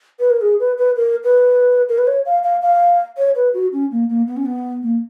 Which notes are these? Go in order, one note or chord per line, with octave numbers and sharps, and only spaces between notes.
B4
A#4
G#4
B4
B4
A#4
B4
A#4
B4
C#5
F5
F5
F5
C#5
B4
F#4
C#4
A#3
A#3
B3
C#4
B3
A#3